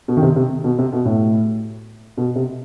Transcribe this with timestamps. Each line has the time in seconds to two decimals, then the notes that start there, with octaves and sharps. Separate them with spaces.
0.08 B2
0.17 D#3
0.22 C3
0.36 C3
0.64 B2
0.78 C3
0.92 B2
1.05 A2
2.17 B2
2.35 C3